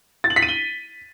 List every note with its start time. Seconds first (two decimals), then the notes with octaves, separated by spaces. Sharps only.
0.24 A6
0.30 F#7
0.36 B6
0.42 D#7
0.49 G7